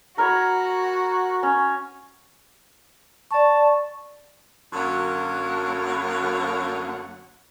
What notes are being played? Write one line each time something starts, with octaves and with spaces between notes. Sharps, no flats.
F#4 A#4 C#5 B5
C#4
D5 A5 C#6
F#2 D3 F#3 A#3 C#5 F#5